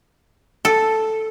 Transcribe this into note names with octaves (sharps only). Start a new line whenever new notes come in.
A4